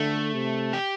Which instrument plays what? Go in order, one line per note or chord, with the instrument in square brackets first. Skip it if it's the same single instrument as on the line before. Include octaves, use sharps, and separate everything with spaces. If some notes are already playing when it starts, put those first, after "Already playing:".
Already playing: [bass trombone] D3 [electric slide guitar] A3
[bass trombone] C3
[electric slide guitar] G4